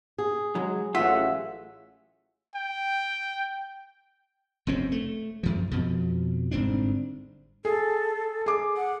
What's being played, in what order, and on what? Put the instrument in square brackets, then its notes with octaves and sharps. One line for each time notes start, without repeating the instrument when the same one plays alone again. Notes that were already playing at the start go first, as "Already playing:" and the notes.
[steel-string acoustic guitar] G#4
[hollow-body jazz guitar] F#3 G#3
[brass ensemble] A1 F#3 F#5 [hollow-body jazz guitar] A3 F4 [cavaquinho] E5
[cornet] G5
[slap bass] F1 F#2 C4 C#4
A3
F#2 F3
F2 B2 F3
G1 G#2 C4 D4
[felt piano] G#4 [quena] A4
[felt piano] G#4 D6
[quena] F#5